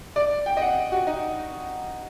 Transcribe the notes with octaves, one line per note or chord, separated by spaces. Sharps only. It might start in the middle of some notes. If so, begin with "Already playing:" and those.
D5
G5
D#5
F#5
F#4
D#4